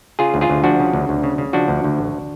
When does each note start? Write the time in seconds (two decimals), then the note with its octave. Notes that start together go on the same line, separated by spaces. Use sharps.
0.19 C#3 F4 G#4
0.34 D2
0.41 F4 G#4
0.50 D2
0.64 F3 D4 F#4
0.80 C#3
0.93 D2
1.09 D2
1.23 C#3
1.38 C#3
1.53 F3 D4 F#4
1.68 D2
1.84 D2
1.99 A1